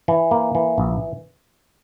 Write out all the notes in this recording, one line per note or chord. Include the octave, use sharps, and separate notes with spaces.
E3
A#3
E3
A#1